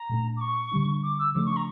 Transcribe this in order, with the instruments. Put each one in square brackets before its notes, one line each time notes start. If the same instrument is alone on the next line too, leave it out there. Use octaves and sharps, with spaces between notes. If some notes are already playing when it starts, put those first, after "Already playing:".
Already playing: [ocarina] A#5
[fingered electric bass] A#2 A3 D4
[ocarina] D6
C#6
[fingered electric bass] D3 G3 D4
[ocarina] D6
E6
[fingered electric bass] C#3 F3 A3 D4 [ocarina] D6
[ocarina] C#6
A#5